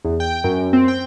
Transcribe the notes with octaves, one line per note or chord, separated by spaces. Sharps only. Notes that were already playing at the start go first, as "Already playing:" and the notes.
E2
G5
F#2
C4
G5